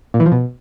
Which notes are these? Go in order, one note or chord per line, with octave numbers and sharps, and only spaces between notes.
A#2
E3
F3
B2